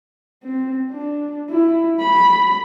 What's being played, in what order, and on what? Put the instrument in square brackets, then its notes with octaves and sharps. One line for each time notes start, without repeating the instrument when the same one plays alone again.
[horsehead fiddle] C4
D4
E4
B5